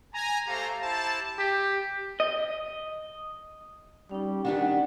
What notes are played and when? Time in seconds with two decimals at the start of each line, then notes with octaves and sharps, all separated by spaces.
0.14 G#5 A#5
0.47 A3 G4 A4 C5 F5 A#5
0.82 E4 G4 C5 A5
1.39 G4
2.20 D#5
4.11 G3 C#4 D#4
4.45 D#3 D4 G4 F#5